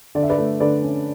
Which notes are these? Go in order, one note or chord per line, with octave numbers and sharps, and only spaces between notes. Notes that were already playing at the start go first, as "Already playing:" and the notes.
D3 D5
E5
B4 D5
A3
D3 B4 D5
C#4